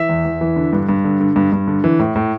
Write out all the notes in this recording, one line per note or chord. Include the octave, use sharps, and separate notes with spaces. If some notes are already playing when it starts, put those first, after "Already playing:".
Already playing: E3 E5
E2
E2
E3
D3
G2
G2
D3
D3
G2
G2
D3
E3
A2
A2